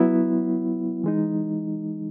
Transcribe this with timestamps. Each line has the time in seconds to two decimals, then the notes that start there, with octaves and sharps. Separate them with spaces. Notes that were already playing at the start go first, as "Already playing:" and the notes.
Already playing: F#3 B3 E4
1.04 E3 G#3 D#4